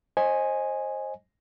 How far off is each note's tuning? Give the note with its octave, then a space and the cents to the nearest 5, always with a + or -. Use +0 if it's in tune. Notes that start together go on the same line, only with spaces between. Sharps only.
C5 +25 D#5 +0 G#5 +0